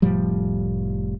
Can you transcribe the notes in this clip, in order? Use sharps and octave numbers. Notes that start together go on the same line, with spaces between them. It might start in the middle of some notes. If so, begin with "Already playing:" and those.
F1 A2 F3 G3